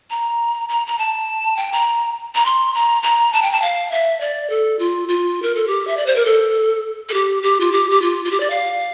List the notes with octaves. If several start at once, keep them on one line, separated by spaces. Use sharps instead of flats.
A#5
A#5
A#5
A5
G5
A#5
A#5
C6
A#5
A#5
A5
G5
A5
F5
E5
D5
A4
F4
F4
A#4
A4
G4
E5
D5
C5
A#4
A4
A4
G4
G4
F4
G4
G4
F4
F4
G4
D5
F5